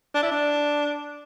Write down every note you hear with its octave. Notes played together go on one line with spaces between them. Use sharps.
D4
E4
D4